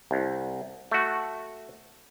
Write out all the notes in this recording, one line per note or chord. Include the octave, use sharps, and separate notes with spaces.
C2
A3 F#4